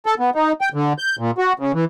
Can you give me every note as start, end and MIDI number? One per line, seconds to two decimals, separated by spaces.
0.06 0.14 69
0.20 0.30 59
0.35 0.52 63
0.61 0.69 79
0.74 0.93 50
0.98 1.16 91
1.19 1.31 46
1.38 1.53 66
1.59 1.72 49
1.74 1.85 52